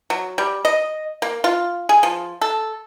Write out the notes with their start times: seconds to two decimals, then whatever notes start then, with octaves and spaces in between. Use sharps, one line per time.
0.10 F#3
0.38 G3
0.65 D#5
1.22 A#3
1.44 F4
1.89 G#4
2.03 F3
2.41 A4